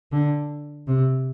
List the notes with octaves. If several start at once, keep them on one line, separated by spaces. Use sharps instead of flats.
D3
C3